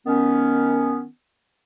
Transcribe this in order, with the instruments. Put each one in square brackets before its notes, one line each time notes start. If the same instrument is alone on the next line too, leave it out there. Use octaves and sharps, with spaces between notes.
[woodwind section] D#3 B3 C#4